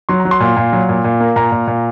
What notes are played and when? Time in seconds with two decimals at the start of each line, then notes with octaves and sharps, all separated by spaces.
0.09 F#3 C6
0.20 A#5
0.25 F#3
0.31 C6
0.40 A#2
0.57 A#2
0.73 F#3
0.89 A#2
1.04 A#2
1.20 A#3
1.36 A#2 A#5
1.52 A#2
1.67 A#2